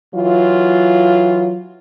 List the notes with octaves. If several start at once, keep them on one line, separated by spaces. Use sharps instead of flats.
E3 F#3 F4